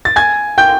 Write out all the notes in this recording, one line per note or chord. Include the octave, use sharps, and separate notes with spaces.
A6
G#5 G#6
G5 G6